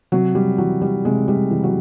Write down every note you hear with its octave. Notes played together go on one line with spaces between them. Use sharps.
C3 F#3
G3
E3 F#3
G3
C3 G#3
G3
E3
F#3